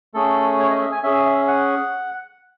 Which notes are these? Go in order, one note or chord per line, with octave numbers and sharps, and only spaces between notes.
A3 C#4 G#4 A4
C#5
D#5
E5
G#5
C#4 G#4 E5
E5
F#5